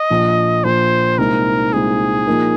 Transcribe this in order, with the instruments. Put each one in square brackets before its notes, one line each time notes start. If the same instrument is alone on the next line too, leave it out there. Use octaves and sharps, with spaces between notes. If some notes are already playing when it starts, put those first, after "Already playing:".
Already playing: [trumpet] D#5
[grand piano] A#1 A#2 F3
[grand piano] A#1 A#2 F3 [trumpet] C5
[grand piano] C2 A#2 G#3 C4 D#4 [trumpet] A#4
[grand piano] C2 A#2 G#3 C4 D#4 [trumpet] G#4
[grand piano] A#2 F3 A#3 D#4